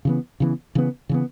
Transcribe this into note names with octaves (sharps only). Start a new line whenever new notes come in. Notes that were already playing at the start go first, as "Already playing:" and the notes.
C#3 E3 B3
C#3 E3 B3
C#3 E3 B3
C#3 E3 B3